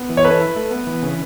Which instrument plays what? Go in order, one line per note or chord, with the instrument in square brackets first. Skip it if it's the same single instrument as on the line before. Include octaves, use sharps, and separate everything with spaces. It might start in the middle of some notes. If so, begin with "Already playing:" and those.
Already playing: [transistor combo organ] B3
E3
[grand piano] C#5
[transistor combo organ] A4 [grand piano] B4
[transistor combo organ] E4
A3
B3
E3
C#3